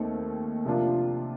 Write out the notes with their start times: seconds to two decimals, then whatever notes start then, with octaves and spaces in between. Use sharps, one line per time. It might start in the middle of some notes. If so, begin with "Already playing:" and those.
Already playing: D#2 D#3 A3 C4
0.65 C3 F3 A#3 D4 F4